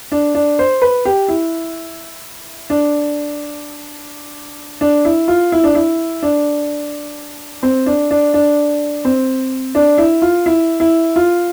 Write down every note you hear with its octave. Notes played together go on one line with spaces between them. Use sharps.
D4
D4
C5
B4
G4
E4
D4
D4
E4
F4
E4
D4
E4
D4
C4
D4
D4
D4
C4
D4
E4
F4
E4
E4
F4